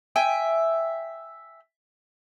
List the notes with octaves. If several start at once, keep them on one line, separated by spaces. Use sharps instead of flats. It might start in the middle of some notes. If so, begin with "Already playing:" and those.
E5 G5 G#5